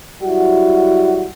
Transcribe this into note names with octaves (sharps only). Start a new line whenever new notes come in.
F#3 G3 E4 F#4